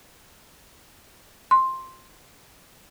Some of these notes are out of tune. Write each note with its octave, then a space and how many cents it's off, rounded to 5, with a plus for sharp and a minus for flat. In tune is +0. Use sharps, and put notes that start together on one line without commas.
C6 +5